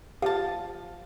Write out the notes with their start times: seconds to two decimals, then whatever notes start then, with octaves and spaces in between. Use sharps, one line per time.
0.22 F3 G4 F5 A5